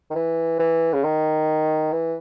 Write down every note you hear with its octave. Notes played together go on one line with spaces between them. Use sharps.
D#3
E3
E3
C#3
D#3
E3